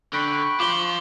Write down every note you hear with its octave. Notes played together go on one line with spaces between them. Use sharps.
D3 G5 B5 C#6 F#6
F4 C5 D6 F#7 G7